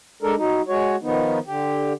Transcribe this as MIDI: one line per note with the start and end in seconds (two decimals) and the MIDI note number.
0.22 0.35 56
0.22 0.35 62
0.22 0.35 69
0.22 0.35 70
0.37 0.62 54
0.37 0.62 63
0.68 0.96 56
0.68 0.96 66
0.68 0.96 73
1.02 1.39 51
1.02 1.39 53
1.02 1.39 59
1.02 1.39 63
1.47 1.93 50
1.47 1.93 67